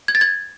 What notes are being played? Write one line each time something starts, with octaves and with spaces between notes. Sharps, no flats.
G#6
A6
G#6